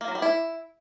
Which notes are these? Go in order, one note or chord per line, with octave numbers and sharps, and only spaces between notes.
A#3
F#3
G3
E4